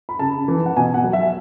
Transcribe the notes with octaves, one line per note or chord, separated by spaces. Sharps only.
B5
C#3 A5
E3
F#5
B2 G#5
F#5
F#3
E5